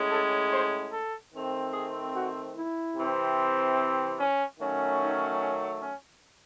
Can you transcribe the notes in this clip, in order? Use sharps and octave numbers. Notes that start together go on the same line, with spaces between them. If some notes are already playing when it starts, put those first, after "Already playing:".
Already playing: A2 G#3 C#4
A4
C5
A4
D#3 A3 C4
G#4
F#4
E4
C3 E3 C4
C#4
D#3 F#3 A3 C#4
D#4
C#4
C#4